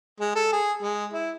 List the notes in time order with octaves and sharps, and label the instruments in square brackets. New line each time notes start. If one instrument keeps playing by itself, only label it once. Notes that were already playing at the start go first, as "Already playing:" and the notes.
[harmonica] G#3
A4
G#4
G#3
E4